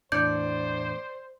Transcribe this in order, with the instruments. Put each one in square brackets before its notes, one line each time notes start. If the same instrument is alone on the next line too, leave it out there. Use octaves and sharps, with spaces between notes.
[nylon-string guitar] E2 A2 D4 [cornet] C5 [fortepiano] D5 [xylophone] G6 C#7